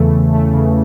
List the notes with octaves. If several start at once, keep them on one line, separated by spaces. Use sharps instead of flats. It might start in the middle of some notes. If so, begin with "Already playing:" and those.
Already playing: E2 C#3 E3 A3
E2
A3
C#3